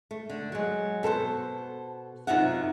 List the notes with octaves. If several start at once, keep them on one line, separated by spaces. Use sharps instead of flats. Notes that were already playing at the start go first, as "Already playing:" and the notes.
A3
D3
F#3 G#3
B2 A4 B4 C5
F#2 C3 D#4 F4 E5 F#5